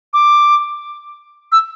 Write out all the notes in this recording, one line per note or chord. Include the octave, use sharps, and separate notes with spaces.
D6
E6